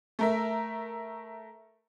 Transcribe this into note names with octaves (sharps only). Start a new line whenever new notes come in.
A3 A#4 E5